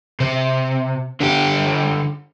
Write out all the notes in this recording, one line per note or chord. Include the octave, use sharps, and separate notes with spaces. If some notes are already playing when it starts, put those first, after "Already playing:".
C3
D3 G4